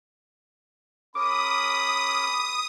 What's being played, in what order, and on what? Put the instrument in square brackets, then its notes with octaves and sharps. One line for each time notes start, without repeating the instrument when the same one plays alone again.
[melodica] C#4 G#4 A#4 [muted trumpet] B5 [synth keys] D6 [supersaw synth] D#6